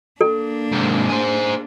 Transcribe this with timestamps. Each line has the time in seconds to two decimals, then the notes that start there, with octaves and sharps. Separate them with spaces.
0.21 A#3 D4 A4
0.72 G#2 C3
1.09 G#4 C5